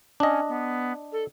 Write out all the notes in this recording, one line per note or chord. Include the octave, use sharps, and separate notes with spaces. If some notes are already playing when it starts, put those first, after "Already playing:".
C#4 D4 D#5
B3
A4